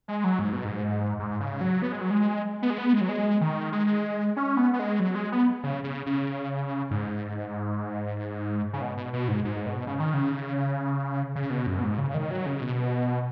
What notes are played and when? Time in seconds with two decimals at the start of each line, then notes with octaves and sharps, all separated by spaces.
0.08 G#3
0.24 F#3
0.39 G#2
0.53 B2
0.65 G#2
1.19 G#2
1.40 C#3
1.61 F#3
1.82 B3
1.92 G#3
2.01 F#3
2.11 G#3
2.62 B3
2.70 G#3
2.78 B3
2.93 G#3
3.01 F#3
3.09 G#3
3.41 D#3
3.72 G#3
4.37 C#4
4.57 B3
4.73 B3
4.79 G#3
5.00 F#3
5.15 G#3
5.32 B3
5.63 C#3
5.84 C#3
6.06 C#3
6.91 G#2
8.73 C#3
8.82 B2
8.97 B2
9.13 B2
9.28 G#2
9.45 G#2
9.66 B2
9.87 C#3
10.00 D#3
10.14 C#3
11.36 C#3
11.50 B2
11.67 F#2
11.79 B2
11.83 G#2
11.98 C#3
12.14 D#3
12.31 F#3
12.46 C#3
12.62 B2